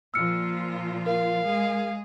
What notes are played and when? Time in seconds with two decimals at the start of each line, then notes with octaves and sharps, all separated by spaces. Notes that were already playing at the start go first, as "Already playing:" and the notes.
0.14 A#2 F3 F4 E6 F6 C#7
1.06 A#4 F5
1.44 G#3 G#4